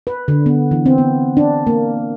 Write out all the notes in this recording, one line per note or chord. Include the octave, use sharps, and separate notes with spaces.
B4
D3
B3
E3
C4
B3
D4
A#3